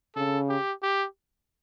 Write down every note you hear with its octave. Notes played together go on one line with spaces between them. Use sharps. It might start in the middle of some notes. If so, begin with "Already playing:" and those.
C#3 A4
G4
G4